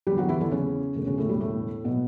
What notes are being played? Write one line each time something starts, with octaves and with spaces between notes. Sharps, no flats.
E2 D3 F#3 G3 G4
F#3 F#4
E3 E4
D3 D4
C#3 C#4
E1 D2 C#3
C#3 C#4
A2 A3
G3
A2 A3
B2 F#3 B3